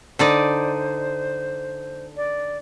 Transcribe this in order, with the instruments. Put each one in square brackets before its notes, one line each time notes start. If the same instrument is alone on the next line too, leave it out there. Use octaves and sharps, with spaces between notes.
[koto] D3 D#4 D5 [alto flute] C5
[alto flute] D5